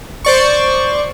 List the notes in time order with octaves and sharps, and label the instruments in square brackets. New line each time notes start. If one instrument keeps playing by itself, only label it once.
[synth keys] C5 D5 C#6